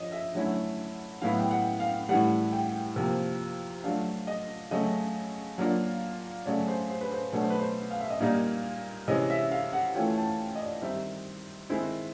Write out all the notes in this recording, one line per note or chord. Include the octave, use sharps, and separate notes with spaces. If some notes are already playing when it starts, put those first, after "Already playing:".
Already playing: F3 C#5 D#5
E5
D3 F#3 A3 C#4 E4
A2 F#3 B3 E4 F5
G5
F#5
F5
A2 E3 G3 F#5
G5
C3 F3 A#3
F#3 A3 D4 F4 F5
D#5
C#3 F#3 A3 D#5
F#3 A#3 D4 F4
C#3 F#3 A3 C#4 D5
C5
C5
B4
C5
B2 F#3 A3 D4 C#5
C5
B4
C5
F5
E5
D#5
A#2 G3 A#3 D#4 D5
C3 E3 G#3 C#4 D#5
E5
F5
F#5
E3 A3 C#4 F4 G5
A5
D#5
D5
D#3 G3 C4 D#4 E5
D#3 G#3 C4 E4